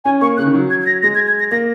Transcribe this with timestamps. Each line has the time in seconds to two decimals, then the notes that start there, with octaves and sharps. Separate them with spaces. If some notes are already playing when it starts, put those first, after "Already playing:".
0.05 C#4 G#5
0.21 A#3 C#6
0.37 C#3 F#6
0.46 D#3
0.54 F#3
0.70 G#6
0.82 G#6
0.86 A#6
1.03 G#3 A#6
1.15 G#6
1.28 G#6
1.39 A#6
1.51 A#3 A#6